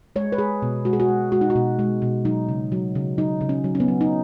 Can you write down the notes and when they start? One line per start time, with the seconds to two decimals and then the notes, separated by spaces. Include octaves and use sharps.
0.16 G#3 C#5
0.32 B4
0.38 G#3 G#4
0.62 B2
0.85 G#3 F#4
0.93 G#4
1.00 F#4
1.09 G#3
1.32 G#3 F#4
1.41 D#4
1.50 F#4
1.56 B2
1.79 G#3
2.02 B2
2.25 F#3 D#4
2.49 C#3
2.72 F#3
2.95 C#3
3.18 F#3 D#4
3.41 C#3
3.49 C#4
3.64 F#3
3.75 C#4
3.80 B3
3.88 F#3
4.01 D#4